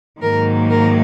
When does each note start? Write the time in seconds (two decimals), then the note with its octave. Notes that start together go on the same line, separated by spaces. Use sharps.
0.22 G#2 D#3 F#3 A#3 A#4
0.69 A#4